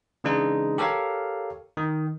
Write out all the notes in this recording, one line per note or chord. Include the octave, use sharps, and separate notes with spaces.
C#3 E3 G#3 D4 D#4
G4 A4 A#4 C#5 F5
D#3